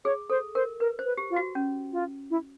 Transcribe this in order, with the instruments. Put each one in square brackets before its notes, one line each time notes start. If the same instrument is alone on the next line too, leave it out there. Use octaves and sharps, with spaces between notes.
[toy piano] G#4 [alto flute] C#5
[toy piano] A4 [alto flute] C5
[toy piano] A#4 [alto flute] C5
[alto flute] A#4 [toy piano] B4
[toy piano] C5
[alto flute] B4
[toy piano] G4
[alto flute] F4
[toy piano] F#4
C#4
[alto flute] F4
E4